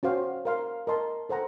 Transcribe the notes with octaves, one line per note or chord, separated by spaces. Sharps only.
C#4 F#4 C5 F5
A#4 F5 C6
A#4 D#5 A5 C6
A4 C5 F#5 A#5